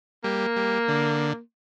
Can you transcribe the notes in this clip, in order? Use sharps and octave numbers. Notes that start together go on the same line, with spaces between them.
G3 A#3
G3
D3